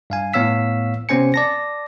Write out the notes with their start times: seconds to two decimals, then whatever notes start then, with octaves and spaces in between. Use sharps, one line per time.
0.10 G2 F5 G#5
0.34 A2 B3 C#5 F5 E6 B6
1.09 C3 B3 C#4 C5 G#5 C#7
1.34 D5 A5 A#6